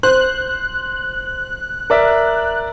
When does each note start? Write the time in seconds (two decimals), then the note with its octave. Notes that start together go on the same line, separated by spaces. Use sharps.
0.03 C5 F#6
1.90 A#4 D5 E5